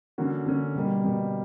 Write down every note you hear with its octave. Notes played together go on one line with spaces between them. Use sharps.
D3 A#3 C#4 F#4
D3 A#3 C#4 F#4
B2 G3 A#3
B2 G3 A#3